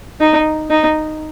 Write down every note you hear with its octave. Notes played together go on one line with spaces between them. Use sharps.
D#4
D#4